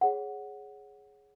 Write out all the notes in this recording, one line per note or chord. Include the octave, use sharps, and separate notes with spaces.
G#4 C#5 F#5